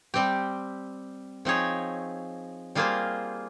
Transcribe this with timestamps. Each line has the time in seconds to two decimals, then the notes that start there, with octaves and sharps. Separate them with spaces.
0.14 G3 C4 G4
1.45 F3 C4 D#4 G#4 C#5
2.75 G3 A#3 F4 G#4 C5